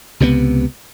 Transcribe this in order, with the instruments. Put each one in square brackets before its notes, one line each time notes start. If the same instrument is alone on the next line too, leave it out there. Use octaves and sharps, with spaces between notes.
[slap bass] C#2 C3 F#3 B3